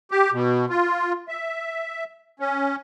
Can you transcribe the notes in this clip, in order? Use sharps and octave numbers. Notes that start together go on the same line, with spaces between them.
G4
B2
F4
E5
C#4